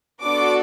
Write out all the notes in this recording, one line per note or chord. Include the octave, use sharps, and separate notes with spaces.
B3 D4 F#4 A4 D6